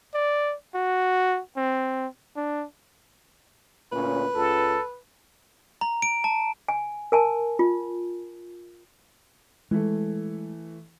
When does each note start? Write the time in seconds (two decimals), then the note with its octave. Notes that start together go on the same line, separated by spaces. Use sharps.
0.14 D5
0.75 F#4
1.56 C4
2.36 D4
3.92 D2 A#2 C#4 B4
4.35 C#2 A4
5.81 A#5
6.02 D7
6.24 A5
6.68 G#5
7.12 A#4 G#5 A5
7.59 F4
9.71 E3 G#3 A3